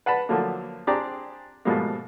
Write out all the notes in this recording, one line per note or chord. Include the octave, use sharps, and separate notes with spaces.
B4 F#5 A5 B5
D3 F3 F#3 A3 A#3
C4 D4 G4 G#4 D5 A#5
G#2 B2 F3 G3 A3 A#3